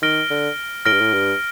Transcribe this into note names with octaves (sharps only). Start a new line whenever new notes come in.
D#3 F6 A#6 D7 G7
D3
A2 F6 A#6 D7 G7
G2
A2
G2